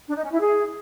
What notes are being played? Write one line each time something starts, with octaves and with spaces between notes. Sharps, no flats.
D4
D#4
C#4
E4
G#4